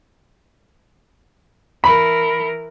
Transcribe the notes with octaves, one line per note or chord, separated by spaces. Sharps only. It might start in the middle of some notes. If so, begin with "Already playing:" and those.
E3 A#4 B5